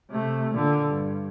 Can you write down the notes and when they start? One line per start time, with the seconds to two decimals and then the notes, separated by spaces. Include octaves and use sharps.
0.10 C3 A3
0.53 A#2 D3
0.88 G2